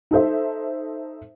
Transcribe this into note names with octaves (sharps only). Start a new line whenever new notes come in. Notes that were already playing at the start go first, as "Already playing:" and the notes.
D#4 A4 C5 E5